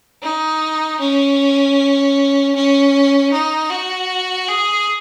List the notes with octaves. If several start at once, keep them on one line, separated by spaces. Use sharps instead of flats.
D#4
C#4
C#4
D#4
F#4
G#4